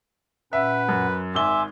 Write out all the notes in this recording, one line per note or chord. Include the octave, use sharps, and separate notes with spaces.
A#2 C#4 B4 E5 F#5
F#2
G#1 E5 G#5 C6 D6 G7